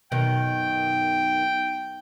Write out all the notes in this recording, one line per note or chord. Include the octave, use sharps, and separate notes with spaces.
F#2 B2 D#3 G5